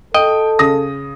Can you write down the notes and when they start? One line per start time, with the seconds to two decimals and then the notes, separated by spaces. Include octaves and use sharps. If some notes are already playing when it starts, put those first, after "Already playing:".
0.14 A4 D#5 G5
0.59 C#3 D#6 A#6